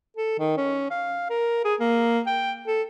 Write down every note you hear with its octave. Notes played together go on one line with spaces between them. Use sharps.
A4
D#3
C#4
F5
A#4
G#4
A#3
G5
A4